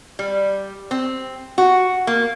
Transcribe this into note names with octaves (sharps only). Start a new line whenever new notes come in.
G3
C4
F#4
A#3